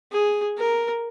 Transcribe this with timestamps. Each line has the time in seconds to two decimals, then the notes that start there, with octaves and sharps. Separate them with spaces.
0.11 G#4
0.57 A#4